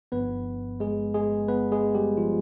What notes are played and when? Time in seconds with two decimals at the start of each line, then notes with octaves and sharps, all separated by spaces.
0.12 G1 G2 F3 B3 B4
0.80 G#3 G#4
1.14 G#3 G#4
1.48 B3 B4
1.72 G#3 G#4
1.95 G3 G4
2.17 F3 F4